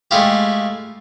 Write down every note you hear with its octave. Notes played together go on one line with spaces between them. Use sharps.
G#3 A3 E4 F4 G4